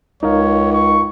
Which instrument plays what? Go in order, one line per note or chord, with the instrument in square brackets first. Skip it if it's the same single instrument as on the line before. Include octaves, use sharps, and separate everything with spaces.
[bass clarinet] C#2 [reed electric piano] D#4 A#4 F5 [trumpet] C#5
[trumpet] C#6